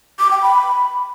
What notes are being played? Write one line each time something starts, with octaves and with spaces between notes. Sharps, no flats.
D6
G5
B5